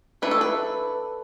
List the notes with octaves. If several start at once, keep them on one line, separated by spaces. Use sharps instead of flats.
E3 A3 D4 B4
A4
B4